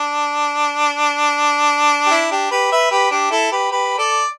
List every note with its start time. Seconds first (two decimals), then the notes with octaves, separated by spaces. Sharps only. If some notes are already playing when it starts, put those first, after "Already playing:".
Already playing: D4
2.06 G4
2.11 E4
2.31 D4 G4
2.51 G4 B4
2.71 B4 E5
2.91 G4 B4
3.11 D4 G4
3.31 E4 A4
3.52 G4 B4
3.71 G4 B4
3.98 A4 D5